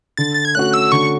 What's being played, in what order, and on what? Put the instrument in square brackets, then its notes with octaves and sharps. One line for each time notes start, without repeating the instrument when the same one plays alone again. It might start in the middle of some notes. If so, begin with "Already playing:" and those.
[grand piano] D3 [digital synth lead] A6
[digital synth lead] A6
G#6
[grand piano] A3 C#4 F#4 [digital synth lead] F#6
[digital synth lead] E6
[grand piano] D3 [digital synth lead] C#6